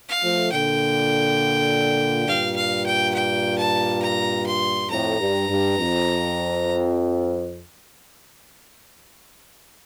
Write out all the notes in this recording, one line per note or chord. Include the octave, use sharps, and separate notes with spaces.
F5
F3 A3
A#2 D3 G5
G2 A#2 F5
F5
G5
G5
A5
A#5
C6
F2 A2 A#5
G2
G2
F2